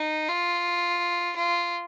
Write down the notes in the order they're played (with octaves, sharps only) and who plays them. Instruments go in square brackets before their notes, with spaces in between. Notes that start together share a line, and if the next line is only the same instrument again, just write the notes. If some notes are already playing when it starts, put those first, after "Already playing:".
Already playing: [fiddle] D#4
F4
F4